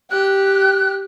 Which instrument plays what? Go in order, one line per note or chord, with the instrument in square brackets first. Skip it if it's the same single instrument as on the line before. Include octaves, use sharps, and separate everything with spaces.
[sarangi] G4 [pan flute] F#6